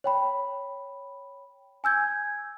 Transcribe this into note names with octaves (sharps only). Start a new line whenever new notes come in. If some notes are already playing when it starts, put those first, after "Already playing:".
C#5 G5 B5
G#5 E6 G6 G#6